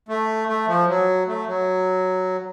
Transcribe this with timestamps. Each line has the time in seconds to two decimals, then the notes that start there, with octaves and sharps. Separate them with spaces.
0.09 A3
0.48 A3
0.67 F3
0.87 F#3
1.27 A3
1.47 F#3